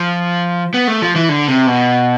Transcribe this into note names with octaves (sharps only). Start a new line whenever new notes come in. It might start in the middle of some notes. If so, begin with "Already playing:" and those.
Already playing: F3
B3
A3
F3
E3
D3
C3
B2